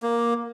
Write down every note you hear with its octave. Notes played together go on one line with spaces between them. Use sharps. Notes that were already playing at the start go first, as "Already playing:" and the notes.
A#3